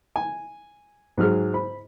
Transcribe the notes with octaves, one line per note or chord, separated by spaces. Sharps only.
G#5
G#2 F#3 G#4 F6
C5 B5